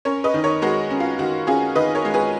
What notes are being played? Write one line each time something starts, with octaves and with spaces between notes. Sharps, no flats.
C#4 A#4 C#5
B4 D#5
D#3
A#4 C#5
G#3 F#4 A#4
C#4
F4
D#3 F#4
C#4 F4 G#4
D#3 B4 D#5
A#4 C#5
G#3
G#4 B4